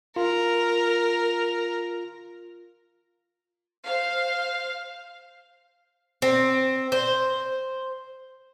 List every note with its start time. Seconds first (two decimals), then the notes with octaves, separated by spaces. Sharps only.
0.16 F4 A#4
3.85 C5 F5
6.22 C4
6.92 C5